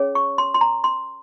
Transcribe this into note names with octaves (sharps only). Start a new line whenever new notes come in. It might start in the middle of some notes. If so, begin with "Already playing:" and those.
Already playing: C#4 G#4 C#5
C#6
C6
C6
A#5
C6